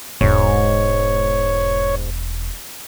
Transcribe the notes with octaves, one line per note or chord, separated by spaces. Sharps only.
E1 G#2 C#5